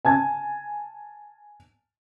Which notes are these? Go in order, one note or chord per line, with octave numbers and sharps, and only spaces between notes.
G#5 A5 G#6